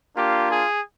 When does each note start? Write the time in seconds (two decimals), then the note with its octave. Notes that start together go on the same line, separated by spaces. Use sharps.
0.16 A#3 D4 F4 G4
0.49 G#4